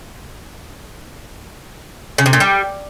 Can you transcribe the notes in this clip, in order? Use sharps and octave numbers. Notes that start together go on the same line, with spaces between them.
C#3
C3
A#2
G3